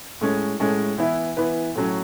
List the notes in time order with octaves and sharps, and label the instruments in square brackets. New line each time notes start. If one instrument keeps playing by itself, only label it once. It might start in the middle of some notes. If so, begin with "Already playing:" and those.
[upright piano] A2 G#3 C#4
A2 G#3 C#4
E3 B3 E4 B4
E3 B3 E4 B4
A2 F#3 C#4